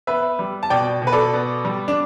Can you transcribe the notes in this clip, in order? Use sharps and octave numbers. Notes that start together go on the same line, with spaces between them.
B3 B4 E5
G3
A5
B2 D5 G5
B2
B4
A4 D5
B3
G3
D4